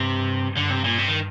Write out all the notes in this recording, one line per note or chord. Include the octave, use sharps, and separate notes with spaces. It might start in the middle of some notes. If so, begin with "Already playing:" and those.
Already playing: G2 C3
G2 D3
C3
A#2
C3
D#3